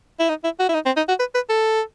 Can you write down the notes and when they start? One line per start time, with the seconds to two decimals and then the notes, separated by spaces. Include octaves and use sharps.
0.20 E4
0.29 D#4
0.44 E4
0.59 F#4
0.69 E4
0.74 D#4
0.86 C4
0.97 D#4
1.08 F#4
1.19 B4
1.35 B4
1.49 A4